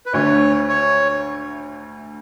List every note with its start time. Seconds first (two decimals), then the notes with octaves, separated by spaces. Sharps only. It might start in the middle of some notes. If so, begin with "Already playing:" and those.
0.06 B4
0.13 D2 D3 A3 C#5
0.69 C#5